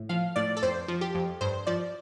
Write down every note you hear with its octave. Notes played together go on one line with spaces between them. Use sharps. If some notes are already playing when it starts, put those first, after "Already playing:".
Already playing: A2
F3 F5
A2 D5
A4
F2 C5
F3
G4
F2
G2 C5
F3 D5